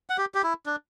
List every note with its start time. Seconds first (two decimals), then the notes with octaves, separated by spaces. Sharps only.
0.10 F#5
0.18 G4
0.34 G4
0.44 E4
0.66 D4